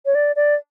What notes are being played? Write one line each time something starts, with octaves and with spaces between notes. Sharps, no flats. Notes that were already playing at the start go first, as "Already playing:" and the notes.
C#5
D5
D5